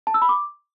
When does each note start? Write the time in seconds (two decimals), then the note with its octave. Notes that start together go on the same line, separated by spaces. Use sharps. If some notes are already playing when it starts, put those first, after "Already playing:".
0.07 A5
0.14 E6
0.22 B5
0.29 D6